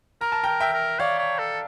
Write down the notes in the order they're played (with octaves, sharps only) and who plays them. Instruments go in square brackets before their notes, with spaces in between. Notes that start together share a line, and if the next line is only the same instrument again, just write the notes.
[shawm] A#4 [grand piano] A#5
[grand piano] A5
[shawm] A#4 [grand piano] G5 A#5
[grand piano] E5 G5
[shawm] A#4
[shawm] C#5 [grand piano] D5 F5
[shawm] C#5
A4